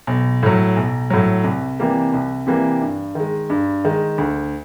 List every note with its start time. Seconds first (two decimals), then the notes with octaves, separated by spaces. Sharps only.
0.07 B1
0.43 A2 F#3
0.77 B1
1.10 A2 F#3
1.44 C2
1.79 C3 E3 G3 A#3
2.14 C2
2.47 C3 E3 G3 A#3
2.82 G2
3.15 D#3 G#3
3.50 G2
3.85 D#3 G#3
4.18 D2